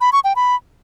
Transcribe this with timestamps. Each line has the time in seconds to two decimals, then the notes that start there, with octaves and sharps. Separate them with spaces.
0.01 B5
0.13 C#6
0.24 G5
0.36 B5